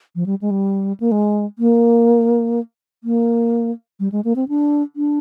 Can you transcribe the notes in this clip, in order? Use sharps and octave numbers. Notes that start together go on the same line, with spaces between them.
F3
G3
G#3
G3
A#3
G#3
A#3
A#3
G3
G#3
A#3
C4
D4
D4